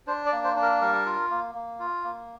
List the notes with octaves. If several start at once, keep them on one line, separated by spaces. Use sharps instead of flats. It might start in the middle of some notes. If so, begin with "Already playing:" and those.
D4 C5
D5
A#3
C5
D4
A#4
G3 A#4
F4
A#3
A#3
F4
A#3